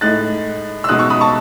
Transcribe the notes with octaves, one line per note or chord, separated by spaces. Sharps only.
A2 G#3 D#4 F#6 A6
E6
B2 G#3 D#4 D#6 F#6
C#6 E6
B5 D#6
A5 C#6